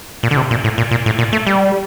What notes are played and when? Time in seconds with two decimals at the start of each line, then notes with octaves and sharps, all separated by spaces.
0.23 A#2
0.31 D3
0.37 C3
0.51 A#2
0.64 A2
0.78 A#2
0.91 A#2
1.06 A2
1.19 A#2
1.33 A3
1.47 G3